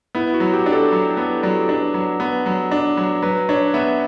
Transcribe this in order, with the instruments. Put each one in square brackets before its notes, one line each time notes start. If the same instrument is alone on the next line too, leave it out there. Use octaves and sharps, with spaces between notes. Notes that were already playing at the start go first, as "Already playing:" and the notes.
[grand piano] B3 [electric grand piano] E4
[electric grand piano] F#4
[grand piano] F#3
[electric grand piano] G4
[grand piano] D4
[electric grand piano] A4
[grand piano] F#3
B3
[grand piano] F#3 [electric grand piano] D5
[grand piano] D4 [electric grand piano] B4
[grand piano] F#3
B3
F#3
D4
F#3
[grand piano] F#3 [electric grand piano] B4
[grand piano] D4 [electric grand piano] C#5
[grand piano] B3 [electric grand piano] E5